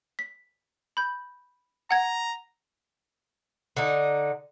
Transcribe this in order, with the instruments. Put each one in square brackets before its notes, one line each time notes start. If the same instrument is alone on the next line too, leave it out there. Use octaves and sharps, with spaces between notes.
[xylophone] B6
B5 G6
[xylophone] F#5 G#6 [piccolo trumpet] A#5
[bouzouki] D3 D#4